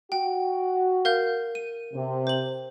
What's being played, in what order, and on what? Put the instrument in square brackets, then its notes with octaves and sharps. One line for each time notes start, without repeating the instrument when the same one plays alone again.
[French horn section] F#4 [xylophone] G5
[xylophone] A#4 F5 G6
D#7
[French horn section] C3
[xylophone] C5 F#7